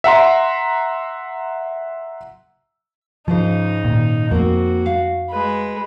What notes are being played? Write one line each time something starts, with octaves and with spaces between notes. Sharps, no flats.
E5 F#5 A#5 C6
G#2 C#3 F3 D#4 C5
A#2 D#3
F2 A#3 C4 F#4
F5
G#3 B4